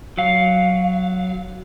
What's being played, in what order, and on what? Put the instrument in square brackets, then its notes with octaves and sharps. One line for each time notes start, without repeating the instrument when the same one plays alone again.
[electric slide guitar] F#3 F5